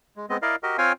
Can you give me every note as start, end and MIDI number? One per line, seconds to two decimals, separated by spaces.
0.17 0.26 56
0.29 0.37 56
0.29 0.37 59
0.29 0.37 60
0.29 0.37 75
0.42 0.56 64
0.42 0.56 70
0.42 0.56 74
0.42 0.56 75
0.42 0.56 77
0.63 0.77 66
0.63 0.77 67
0.63 0.77 70
0.63 0.77 75
0.78 0.92 60
0.78 0.92 65
0.78 0.92 73
0.78 0.92 77
0.78 0.92 79
0.78 0.92 80